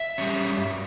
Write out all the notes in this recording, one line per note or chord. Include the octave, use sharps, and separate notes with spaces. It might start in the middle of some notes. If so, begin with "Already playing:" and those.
Already playing: E5
G3 C#4
G2